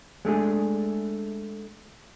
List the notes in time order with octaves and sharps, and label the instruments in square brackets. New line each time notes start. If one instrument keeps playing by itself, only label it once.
[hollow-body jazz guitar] G#3 A3 D4 G#4